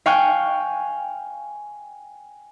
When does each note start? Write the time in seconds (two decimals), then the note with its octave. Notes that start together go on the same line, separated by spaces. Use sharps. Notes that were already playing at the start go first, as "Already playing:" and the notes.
0.06 F5 G5 G#5 C#6 F6 F#6